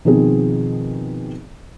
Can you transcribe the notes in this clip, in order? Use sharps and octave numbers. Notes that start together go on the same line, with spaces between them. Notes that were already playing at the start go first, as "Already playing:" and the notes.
B2 D#3 F3 C4 G#4